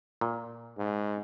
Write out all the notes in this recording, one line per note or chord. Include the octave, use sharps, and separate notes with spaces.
A#2
G#2